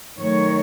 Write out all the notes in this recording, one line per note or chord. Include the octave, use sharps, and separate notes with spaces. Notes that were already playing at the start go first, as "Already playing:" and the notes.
D#3 F#3 A3 C#5